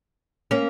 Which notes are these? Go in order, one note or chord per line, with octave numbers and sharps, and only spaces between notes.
A#3 C#4